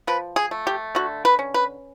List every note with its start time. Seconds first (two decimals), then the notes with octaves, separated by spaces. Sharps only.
0.07 F3 B4
0.36 G#4
0.51 A3
0.67 G4
0.95 D3 F#4
1.25 B4
1.39 C#4
1.54 B4